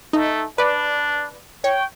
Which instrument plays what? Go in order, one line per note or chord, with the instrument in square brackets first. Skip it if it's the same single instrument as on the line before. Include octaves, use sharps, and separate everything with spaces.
[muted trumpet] A3 [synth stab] D#4
[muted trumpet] D4 [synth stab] B4 D5
[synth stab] C#5 [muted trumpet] G5